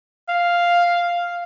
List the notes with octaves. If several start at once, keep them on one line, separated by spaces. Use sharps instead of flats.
F5